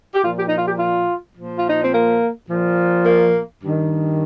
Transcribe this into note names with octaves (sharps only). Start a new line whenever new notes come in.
G4
A#2 F3 F4
G4
D#4
F4
G4
F4
A#2 F3
F4
D#4
C4
A#3
A#2 F3
A#3
G2 D#3